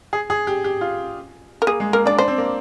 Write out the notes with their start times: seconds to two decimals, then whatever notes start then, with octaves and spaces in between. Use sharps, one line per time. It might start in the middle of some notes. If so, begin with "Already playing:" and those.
0.13 G#4
0.30 G#4
0.47 G4
0.64 G4
0.81 F4
1.62 A#4
1.67 A#3 G#4
1.80 G#3
1.93 A#3 A#4
2.05 D4 D5
2.18 D4 C5
2.28 C4
2.38 A#3